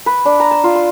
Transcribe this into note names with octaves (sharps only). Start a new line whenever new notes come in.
B4
D4
A#5
A5
F4
C6